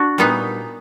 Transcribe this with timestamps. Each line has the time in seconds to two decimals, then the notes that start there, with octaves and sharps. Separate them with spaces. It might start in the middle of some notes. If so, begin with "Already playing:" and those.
Already playing: D4 F#4
0.18 A#2 G3 B3 D#4